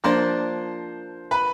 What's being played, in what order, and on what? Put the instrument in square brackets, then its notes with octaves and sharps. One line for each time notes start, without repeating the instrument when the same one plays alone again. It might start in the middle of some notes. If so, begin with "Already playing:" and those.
[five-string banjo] F3 A#3 D4 [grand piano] C5 C6
[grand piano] B4 B5